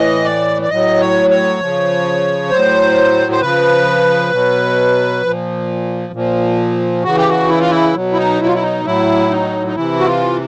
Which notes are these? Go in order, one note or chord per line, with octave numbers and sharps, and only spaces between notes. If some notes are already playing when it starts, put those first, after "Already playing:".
Already playing: A2 E3 D#5
D5
D5
A2 F#3 D#5
C#5
C#5
C#3 F3
A2 F#3 C5
C5
C#3 F3 B4
B2 F#3
A#2 F3
A#2 F3
C#3 E3 F#4
G4
F#4
E4
F4
E4
B2 F#3
E4
D#4
E4
F4
E4
D#4
A2 F#3 E4
D#4
D#4
C3 E3 E4
F#4
F4